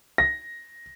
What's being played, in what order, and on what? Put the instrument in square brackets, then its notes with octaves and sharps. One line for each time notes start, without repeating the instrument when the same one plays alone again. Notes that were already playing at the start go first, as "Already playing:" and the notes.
[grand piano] A#6